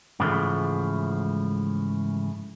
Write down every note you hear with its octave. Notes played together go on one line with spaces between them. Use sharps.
G#2 C#3 E3 F3 G#3 A3